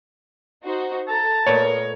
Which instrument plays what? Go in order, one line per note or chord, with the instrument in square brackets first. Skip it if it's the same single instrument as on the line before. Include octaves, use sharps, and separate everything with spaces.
[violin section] D#4 F#4 C5
[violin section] A4 A#5 [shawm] A5
[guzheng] A#2 A3 B3 [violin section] A#4 D#5 [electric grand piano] C#5